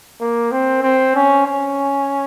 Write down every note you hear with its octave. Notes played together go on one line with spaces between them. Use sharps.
A#3
C4
C4
C#4
C#4